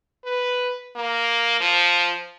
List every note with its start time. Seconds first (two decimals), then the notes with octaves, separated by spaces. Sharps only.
0.25 B4
0.96 A#3
1.61 F3